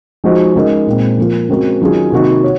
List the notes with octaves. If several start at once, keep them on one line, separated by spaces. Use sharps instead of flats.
F3 G#3 D#4 F#4 C5
C#3 G#3 D#4 A#4 D#5
A#2 G#3 C4
F3 A#3 F4
C#3 G#3 C4 F#4 A#4
D#3 F#3 C#4 F4 G#4
C3 D#3 A#3 D#4 F#4
C#5